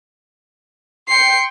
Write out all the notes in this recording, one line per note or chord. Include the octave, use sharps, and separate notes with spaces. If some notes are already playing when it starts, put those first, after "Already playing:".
G5 C6 C7 C#7